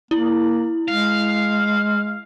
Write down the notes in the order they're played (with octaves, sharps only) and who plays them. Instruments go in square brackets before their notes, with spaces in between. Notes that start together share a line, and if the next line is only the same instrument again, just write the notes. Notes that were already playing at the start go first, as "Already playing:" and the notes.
[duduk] A#3 [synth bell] E4
[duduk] G#3 [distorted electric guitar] F5